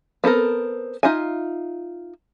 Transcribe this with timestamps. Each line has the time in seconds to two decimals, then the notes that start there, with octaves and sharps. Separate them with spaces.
0.24 B3 C4 A4 A#4
1.03 D#4 F4 E5 G#5